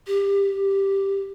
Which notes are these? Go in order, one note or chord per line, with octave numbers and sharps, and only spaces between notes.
G4